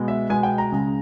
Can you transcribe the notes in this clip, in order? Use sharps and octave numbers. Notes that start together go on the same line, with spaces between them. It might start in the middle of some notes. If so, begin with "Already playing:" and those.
Already playing: B2 G#3 B3
E5
B2 G#3 B3 G#5
G5
A#5
C#2 C#3 G#3